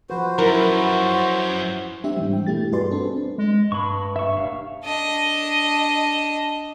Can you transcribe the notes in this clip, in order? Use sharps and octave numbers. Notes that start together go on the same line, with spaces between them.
F3 F#4 B4 C5
F#2 E4 A#4
C4 D4 G4 E5
G#2 E3 G3
G5
B2 A3 E4 G4 A6
G2 F#4 G#4 B4 D5 C6
C4 D4 A4
G#3
G2 B5 C#6
E5 C#6
F1 F5
D4 D#5